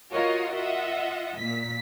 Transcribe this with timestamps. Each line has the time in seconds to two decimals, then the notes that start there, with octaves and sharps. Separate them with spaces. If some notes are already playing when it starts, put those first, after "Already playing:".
0.13 F4 F#4 A#4 C#5 D#5 F5
0.55 F4 D#5 E5 F#5
1.38 A#2 B6